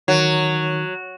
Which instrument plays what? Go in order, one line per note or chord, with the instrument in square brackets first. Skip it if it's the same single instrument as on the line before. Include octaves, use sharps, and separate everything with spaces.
[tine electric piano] D#3 [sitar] F#3